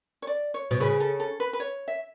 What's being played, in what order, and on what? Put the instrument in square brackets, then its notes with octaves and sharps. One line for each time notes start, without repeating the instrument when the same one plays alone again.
[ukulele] C#5
D5
C#5
[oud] B2
[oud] C#3 [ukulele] B4
[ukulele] A4
A4
B4
B4
C#5
E5